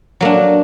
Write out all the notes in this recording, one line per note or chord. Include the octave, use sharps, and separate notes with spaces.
F#3 A#3 D4